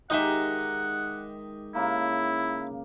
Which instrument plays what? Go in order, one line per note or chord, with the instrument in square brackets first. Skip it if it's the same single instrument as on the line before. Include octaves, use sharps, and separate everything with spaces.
[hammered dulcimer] D#3 G#3 G4 [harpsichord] D#4 D#5 E5 [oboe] F#5
[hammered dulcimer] C#3 A#3 [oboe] E4